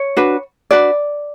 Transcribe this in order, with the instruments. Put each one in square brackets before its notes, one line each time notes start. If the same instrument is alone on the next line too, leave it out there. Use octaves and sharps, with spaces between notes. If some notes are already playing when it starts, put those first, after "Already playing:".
Already playing: [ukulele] C#5
D4 F#4 B4
D4 F#4 B4 D5